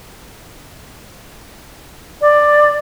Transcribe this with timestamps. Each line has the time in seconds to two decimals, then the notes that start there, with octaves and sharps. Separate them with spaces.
2.21 D5